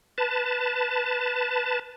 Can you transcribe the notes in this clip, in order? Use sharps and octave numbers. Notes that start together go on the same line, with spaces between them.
B4 A5